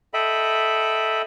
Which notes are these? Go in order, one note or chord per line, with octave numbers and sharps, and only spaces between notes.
A4 D#5 E5 G5 B5